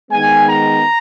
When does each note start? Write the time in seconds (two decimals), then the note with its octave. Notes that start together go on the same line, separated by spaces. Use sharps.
0.11 D#3 G#3 B3 G#5
0.47 A#5